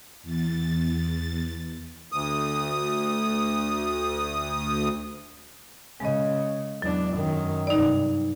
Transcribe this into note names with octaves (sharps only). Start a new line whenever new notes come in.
E2 A6
D2 D#6
C#3 G#3 D#5
E2 F#3 D4
F#2 D#3
G2 C3 D#4 D5